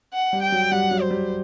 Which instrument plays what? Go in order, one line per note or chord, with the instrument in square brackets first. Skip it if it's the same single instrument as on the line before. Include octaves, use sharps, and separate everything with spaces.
[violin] F#5
[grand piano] G3
[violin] G5
[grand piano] F#3
[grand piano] G3 [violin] F#5
[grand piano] F#3
[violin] C5
[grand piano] G3